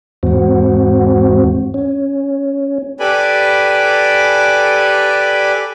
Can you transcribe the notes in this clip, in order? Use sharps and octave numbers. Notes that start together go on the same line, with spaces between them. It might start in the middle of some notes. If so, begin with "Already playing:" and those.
E2 G#2 C4 F#4
C#4
G4 A4 B4 D5 G#5 B5